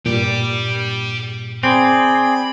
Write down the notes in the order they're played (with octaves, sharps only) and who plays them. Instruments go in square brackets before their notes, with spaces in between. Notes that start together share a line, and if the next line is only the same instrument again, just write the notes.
[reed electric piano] G2 A#2 [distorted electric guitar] G4 D5
[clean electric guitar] C4 [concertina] G#4 D5 [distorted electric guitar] B5